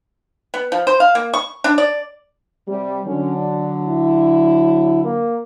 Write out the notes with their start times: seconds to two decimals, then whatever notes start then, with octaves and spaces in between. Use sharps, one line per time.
0.54 B3
0.72 F3
0.87 C5
1.00 F5
1.15 A#3
1.34 C#6
1.64 D4
1.78 D5
2.68 C3 G3
3.06 D3 F#3 C#4
3.37 D4
3.87 E4
5.04 A#3